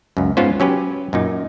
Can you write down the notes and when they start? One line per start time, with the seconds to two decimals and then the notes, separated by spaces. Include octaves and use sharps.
0.17 C#2 F#2
0.37 G#2 B3 C#4 F4 C5
0.60 F#3 C#4 G4 B4
1.13 F#2 A#2 D#4